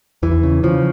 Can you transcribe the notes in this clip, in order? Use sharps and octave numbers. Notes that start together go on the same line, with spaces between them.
E2 E3
C#3
C#3 F3